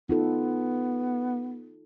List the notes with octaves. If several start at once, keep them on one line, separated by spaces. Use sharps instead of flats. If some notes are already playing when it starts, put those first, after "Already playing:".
B3 D#4 F4 A4